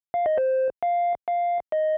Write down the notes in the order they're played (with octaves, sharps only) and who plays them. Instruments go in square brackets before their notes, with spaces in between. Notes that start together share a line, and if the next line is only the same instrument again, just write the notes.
[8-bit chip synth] F5
D#5
C5
F5
F5
D#5